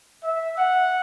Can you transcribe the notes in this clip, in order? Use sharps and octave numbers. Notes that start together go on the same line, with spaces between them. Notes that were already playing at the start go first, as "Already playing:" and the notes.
E5
F#5